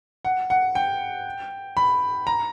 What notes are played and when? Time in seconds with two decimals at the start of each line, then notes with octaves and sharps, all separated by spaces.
0.25 F#5
0.50 F#5
0.75 G5
1.77 B5
2.27 A#5